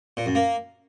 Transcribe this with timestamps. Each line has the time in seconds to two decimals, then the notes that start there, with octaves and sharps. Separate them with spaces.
0.17 A#2
0.26 F#2
0.35 A#3